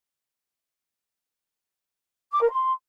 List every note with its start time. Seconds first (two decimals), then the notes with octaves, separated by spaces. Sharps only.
2.32 D6
2.41 A#4
2.51 C6